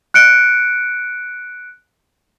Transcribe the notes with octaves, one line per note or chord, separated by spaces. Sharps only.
F#6 C#7 D7